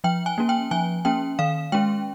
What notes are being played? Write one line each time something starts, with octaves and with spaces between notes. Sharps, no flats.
F3 G5
G#5
A#3 C#4
G5
F3 G#5
A#3 C#4 G5
D#3 F5
G#3 C#4 G5